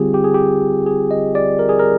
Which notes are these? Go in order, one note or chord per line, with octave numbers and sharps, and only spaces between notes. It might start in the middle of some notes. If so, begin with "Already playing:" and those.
Already playing: D3 G3 C4 F4 G4 G#4
G4
G#4
G4
G#4
D#5
D5
A#4
G#4
A#4